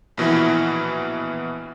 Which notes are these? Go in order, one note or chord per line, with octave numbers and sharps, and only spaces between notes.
A#1 B2 E3 E4